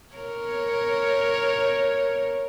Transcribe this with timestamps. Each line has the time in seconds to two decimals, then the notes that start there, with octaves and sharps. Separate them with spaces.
0.14 A#4 C#5